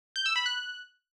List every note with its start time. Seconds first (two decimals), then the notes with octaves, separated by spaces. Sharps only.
0.16 G6
0.26 E6
0.36 B5
0.46 F#6